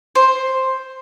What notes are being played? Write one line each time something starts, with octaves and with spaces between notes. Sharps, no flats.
C5